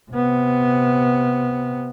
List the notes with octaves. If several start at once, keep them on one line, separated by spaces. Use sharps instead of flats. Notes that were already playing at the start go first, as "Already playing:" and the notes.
C3 B3